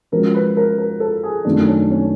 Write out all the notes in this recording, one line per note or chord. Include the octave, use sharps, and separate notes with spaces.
F3 G#3 C#4 F#4 A#4
B4
A#4
A#4
A4
G#4
F#2 D#3 F#3 A3 D4
C#4
C#4